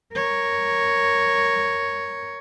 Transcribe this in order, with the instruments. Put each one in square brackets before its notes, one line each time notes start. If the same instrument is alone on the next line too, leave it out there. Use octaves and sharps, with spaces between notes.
[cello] A#4 C#5